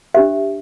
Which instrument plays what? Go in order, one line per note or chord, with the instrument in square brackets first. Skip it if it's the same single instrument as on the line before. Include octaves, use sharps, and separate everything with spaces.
[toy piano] D4 G4 C5 E5